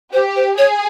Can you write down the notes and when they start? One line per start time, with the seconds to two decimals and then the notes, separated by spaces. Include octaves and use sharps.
0.13 G4 C5
0.36 C5
0.58 G#4 C#5